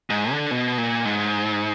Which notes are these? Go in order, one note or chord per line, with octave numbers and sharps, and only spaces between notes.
G#2
D3
B2
A#2
G#2